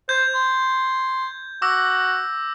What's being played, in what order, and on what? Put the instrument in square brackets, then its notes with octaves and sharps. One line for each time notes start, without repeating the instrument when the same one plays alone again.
[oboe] C5 [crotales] G6 G#6
[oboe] C6
[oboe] F#4 [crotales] D6 E6 A#6